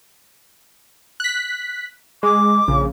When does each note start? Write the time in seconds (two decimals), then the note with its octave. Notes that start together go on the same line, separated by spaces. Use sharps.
1.20 F#6 B6
2.23 G#3 D6
2.68 A#1 C#3